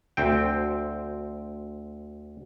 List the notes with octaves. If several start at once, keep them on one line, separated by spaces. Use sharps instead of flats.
D2 C4 G5